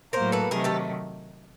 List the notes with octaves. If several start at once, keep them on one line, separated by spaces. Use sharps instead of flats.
A2 F#3 A#3 A#4 C5
A4 B4
C3 D#3 F#3 A3 G#4 A#4
G4 A4